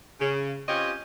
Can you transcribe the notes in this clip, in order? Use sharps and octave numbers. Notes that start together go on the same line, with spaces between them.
C#3
C4 C#4 F4 G4 C#5 D#5